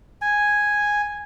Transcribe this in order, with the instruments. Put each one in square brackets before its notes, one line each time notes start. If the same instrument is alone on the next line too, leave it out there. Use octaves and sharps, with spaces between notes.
[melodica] G#5